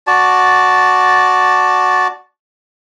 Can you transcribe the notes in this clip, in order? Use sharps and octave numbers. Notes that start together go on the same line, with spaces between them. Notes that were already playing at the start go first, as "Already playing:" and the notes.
F#4 D5 A5